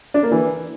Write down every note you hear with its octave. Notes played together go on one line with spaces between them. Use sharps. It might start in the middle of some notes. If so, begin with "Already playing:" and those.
D4
A#3
E3